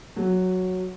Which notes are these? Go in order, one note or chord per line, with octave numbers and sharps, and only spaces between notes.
F#3